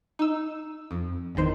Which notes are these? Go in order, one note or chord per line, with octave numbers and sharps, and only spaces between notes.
D#4 E6
F2
G1 E2 D#3 C5